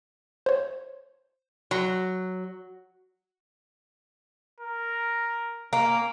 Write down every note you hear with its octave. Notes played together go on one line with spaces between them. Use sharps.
C5 C#5
F#3 F#6
A#4
A#3 C#4